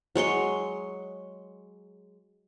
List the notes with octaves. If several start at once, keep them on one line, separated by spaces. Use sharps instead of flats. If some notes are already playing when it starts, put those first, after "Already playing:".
F#3 G#3 C#5 C6